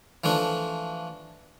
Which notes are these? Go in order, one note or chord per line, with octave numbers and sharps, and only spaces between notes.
E3 F3 A3 D4